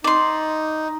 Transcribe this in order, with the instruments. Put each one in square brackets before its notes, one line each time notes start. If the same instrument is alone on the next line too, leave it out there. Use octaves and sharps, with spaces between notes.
[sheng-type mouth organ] D#4 [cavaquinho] D5 C6